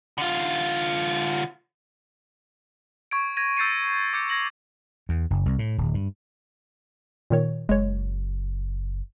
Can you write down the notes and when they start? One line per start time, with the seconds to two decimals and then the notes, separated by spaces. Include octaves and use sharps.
0.18 D3 F4
3.11 C#6 G#6 D7
3.37 G#6 A#6 D#7
3.57 E6 G6 A6 C7 C#7 D#7
4.13 D6 G6 C#7
4.30 G#6 A#6 F#7
5.09 E2
5.30 F#1
5.46 C2
5.59 A2
5.78 D1
5.94 G2
7.30 A#2 D#3 C#5
7.69 F#1 G#3 C#5